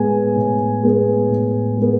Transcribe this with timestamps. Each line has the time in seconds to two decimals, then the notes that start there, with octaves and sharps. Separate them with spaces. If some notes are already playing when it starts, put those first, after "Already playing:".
Already playing: A2 G#3 B3 G#5
0.36 A2
0.83 G#3 B3
1.30 A2
1.77 G#3 B3